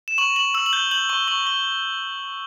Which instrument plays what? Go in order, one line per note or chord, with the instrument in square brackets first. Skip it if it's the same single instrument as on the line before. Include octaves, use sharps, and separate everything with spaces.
[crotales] E7
C#6 F#7
C#6 F#7
E6 F#7
F#7
G6 G7
G6 F#7
C#6 G7
C#6 F#7
C#6 G7